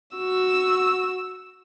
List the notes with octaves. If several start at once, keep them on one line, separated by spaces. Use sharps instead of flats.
F#4 E6